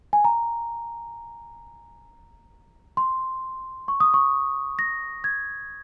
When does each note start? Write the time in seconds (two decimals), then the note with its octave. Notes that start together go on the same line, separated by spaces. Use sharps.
0.13 G#5
0.24 A#5
2.97 C6
3.88 C#6
4.00 D#6
4.14 C#6
4.79 A#6
5.24 G#6